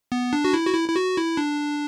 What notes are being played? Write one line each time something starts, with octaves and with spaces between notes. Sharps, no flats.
B3
D4
F#4
E4
F#4
E4
E4
F#4
E4
D4